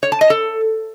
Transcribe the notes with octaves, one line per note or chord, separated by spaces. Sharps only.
C#5
A5
D#5
A4